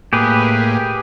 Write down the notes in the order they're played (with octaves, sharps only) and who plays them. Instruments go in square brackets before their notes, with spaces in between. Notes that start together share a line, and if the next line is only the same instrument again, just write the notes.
[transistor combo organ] A2 A#3 [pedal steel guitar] G4 G#4 B4